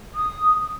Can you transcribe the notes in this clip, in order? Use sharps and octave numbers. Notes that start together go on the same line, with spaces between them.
D#6